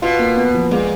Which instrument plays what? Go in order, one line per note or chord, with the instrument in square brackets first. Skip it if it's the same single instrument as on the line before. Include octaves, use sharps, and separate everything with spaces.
[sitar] B2 [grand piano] F4
[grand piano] A#3
B3
F3
[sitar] A#2 [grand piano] G#3